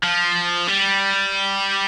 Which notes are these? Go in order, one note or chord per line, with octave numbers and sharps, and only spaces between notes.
F3
G3